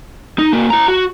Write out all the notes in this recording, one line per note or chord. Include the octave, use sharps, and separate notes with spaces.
D#4
A#3 F#4
E4 A#5
F#4